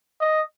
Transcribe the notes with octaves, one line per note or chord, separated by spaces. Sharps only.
D#5